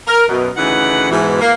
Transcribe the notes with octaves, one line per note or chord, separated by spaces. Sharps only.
A#4
F#2 B2
D2 C#3 E3 D#4 B4 F#5
G#2 B2 E3
A#3